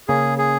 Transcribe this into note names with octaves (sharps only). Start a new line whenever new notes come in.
C#3 A#3 C#4 G#4
G#4